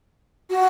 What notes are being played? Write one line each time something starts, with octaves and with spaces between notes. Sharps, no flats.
F#4